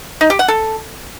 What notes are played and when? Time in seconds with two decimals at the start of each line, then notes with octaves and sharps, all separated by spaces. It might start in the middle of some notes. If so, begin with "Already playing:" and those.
0.21 D#4
0.30 G4
0.39 F#5
0.48 A4